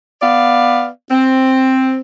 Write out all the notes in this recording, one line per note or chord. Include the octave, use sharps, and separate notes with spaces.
B3 D5 F5
C4